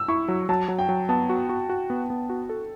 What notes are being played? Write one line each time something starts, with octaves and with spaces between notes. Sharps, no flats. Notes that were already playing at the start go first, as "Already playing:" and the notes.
Already playing: E6
E4 C#6
F#3
F#3 A5
F#3
G5
F#3
B3 A5
F#4
F#4
F#4
B3
B3
F#4
A4